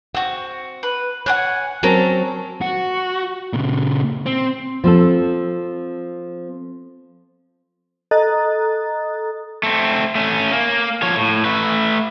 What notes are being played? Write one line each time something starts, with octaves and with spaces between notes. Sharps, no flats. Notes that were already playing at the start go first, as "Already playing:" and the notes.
C4 F#4 F#5
B4
C#5 F#5 G#5 F#6
F#3 C4 C#4 A#4 A5 A#5
F#4
A#2 C#3
C4
F3 C4 A4
A4 D#5 A#5 D#6 F#6 A6
A3 C4
A3 C#4
A#3
F3 C#5
A2
A3 B4